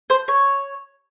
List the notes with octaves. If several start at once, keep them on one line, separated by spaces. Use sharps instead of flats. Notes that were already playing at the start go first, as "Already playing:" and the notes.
C5
C#5